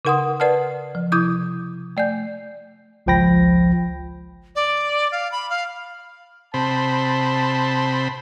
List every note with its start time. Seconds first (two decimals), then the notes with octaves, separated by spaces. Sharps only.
0.05 C#3 D#4 A#4 F#5 C6 D#6
0.40 A#4 B4 D5 F#5 A5 F6
0.95 F3
1.12 C3 E4 D6 D#6 G6 G#6
1.97 A3 D5 G#5 G6
3.06 G#1 C#2 F3 G5 B5 A#6
4.55 D5
5.12 F5
5.32 B5
5.50 F5
6.54 C3 C5 A5 B5